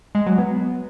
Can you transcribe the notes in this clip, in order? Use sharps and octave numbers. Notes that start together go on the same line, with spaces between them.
G#3
F#3
B3